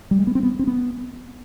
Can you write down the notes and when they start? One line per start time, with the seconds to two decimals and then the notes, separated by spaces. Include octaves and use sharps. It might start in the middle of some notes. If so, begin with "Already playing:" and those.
0.11 G3
0.19 G#3
0.27 B3
0.35 C4
0.43 B3
0.59 C4
0.67 B3